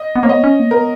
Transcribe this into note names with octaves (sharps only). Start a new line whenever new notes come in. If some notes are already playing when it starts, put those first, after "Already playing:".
Already playing: D#5
B3
A#3 C#5
B3 D#5
C#4
A#3
B3 A#4